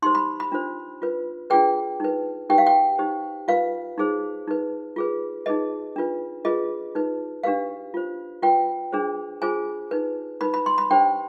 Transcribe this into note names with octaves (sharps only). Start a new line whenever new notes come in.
D#4 G4 C5 C6
B5
B5
D4 F4 C5
F4 B4
D4 F4 G#4 B4 G5
D#4 B4
D#4 G4 B4 G5
F5
G5
D#4 G4 C5
F4 B4 F5
D#4 G#4 C5
D#4 B4
F4 G#4 B4
D#4 G#4 B4 D#5
D4 F4 B4
F4 G#4 B4 D#5
D#4 B4
D4 G4 B4 F5
F4 C5
F4 B4 G5
D4 G#4 C5
F4 G#4 C5 G#5
D#4 B4
D#4 B4 B5
B5
C6
B5
D4 G4 C5 G5